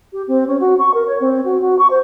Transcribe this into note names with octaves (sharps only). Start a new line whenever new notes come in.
G4
C4
C#4
F#4
C#6
A#4
C#5
C4
F#4
F#4
C#6
C5